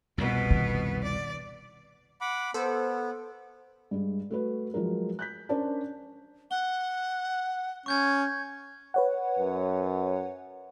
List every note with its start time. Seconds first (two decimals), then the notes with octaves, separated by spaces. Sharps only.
0.18 C2 F2 B2 B3
0.51 D#3
1.04 D5
2.21 F#5 B5 D6
2.54 B3 A4 C5
3.91 G2 G#3
4.31 A3 F#4 B4
4.74 F3 F#3 G#3 A#4
5.19 F#6 G6 B6
5.49 C#4 D4 A#4 C5 D5 A5
6.51 F#5 G7
7.86 C#4 C#6 G6 G#6
8.94 B4 C#5 F#5
9.39 F#2